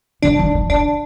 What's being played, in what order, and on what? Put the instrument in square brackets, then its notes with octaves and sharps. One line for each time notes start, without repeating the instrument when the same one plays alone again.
[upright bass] D3 [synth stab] D4
[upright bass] D#3
D#3
[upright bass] D3 [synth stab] D4